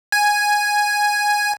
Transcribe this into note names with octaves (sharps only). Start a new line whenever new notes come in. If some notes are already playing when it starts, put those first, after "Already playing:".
G#5